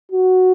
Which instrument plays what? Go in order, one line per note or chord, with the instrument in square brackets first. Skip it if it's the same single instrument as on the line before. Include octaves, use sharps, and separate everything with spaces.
[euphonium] F#4